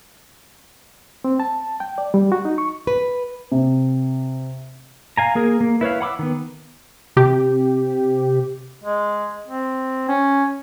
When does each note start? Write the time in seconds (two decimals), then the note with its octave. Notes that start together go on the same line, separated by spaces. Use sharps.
1.24 C4
1.40 A5
1.80 G5
1.98 D5
2.14 G3
2.32 F#4
2.45 D#4
2.58 C#6
2.87 B4
3.52 C3
5.17 F5 G#5 A#5
5.35 A#3 G#4 A#4
5.61 A#3
5.81 E4 B4 C#5 F5
6.01 F#5 B5 D6 E6
6.19 D#3 B3
7.17 C3 G4
8.84 G#3
9.47 C4
10.09 C#4